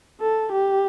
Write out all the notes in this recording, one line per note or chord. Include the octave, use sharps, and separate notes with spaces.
A4
G4